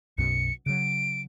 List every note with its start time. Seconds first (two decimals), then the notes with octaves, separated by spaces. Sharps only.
0.18 B1 F#2 B2 C#7
0.66 C#3 F#3 D7